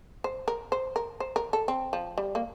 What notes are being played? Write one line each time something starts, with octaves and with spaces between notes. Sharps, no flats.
C5
A#4
C5
A#4
C5
A#4
A4
C4
F3
G3
A#3